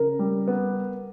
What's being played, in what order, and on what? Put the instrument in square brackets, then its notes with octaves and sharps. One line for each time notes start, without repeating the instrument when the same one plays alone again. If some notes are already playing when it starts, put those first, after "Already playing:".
Already playing: [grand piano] C#3 [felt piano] A#4
[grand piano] G3
B3